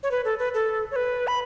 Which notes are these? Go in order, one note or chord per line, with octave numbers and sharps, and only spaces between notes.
C#5
B4
A4
B4
A4
C#5
B4
B5